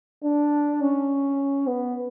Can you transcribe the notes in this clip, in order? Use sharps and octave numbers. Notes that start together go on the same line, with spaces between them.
D4
C#4
B3